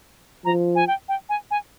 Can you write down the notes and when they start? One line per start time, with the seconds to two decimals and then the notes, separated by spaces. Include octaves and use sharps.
0.45 F3 A#5
0.75 G#5
0.87 G5
1.09 G5
1.29 G#5
1.51 G#5